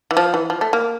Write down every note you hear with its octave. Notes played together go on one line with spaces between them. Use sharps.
E3
F3
E3
F3
A3
A#3